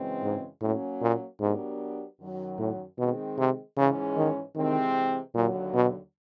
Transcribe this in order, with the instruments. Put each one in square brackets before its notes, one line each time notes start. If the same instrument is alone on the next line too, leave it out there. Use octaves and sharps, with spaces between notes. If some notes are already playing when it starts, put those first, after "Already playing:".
Already playing: [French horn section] F#2 C#3 E3 G#3 C4
[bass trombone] G#2
[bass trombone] A2 [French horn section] F#3 A#3 C#4
[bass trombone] A#2
[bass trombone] G#2 [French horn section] F#3 B3 D4 G4 A#4
[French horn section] F#2 D#3 F#3
[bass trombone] A2
[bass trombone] B2 [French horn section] D#3 G#3 C4
[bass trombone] C3
[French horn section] G#2 E3 G#3 C#4 [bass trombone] C#3
[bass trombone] D#3
[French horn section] C3 E3 G#3 C4 [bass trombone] D#3
[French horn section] D#2 D3 F#3 [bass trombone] A#2
[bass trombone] B2